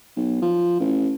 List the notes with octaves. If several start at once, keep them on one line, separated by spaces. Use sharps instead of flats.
B1
F3
A1